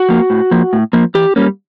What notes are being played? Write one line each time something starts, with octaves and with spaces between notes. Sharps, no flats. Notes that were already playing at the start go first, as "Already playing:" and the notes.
Already playing: F#4
F3 A#3
A2
F3 A#3
A2
F3 A#3
E3 G4
G3 A#3 C#4